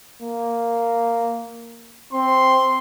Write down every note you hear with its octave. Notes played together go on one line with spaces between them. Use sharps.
A#3
C4 C6